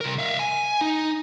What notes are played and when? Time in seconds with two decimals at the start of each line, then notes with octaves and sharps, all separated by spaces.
0.01 C2 A#4
0.19 E5 F5
0.39 G#5
0.81 D#4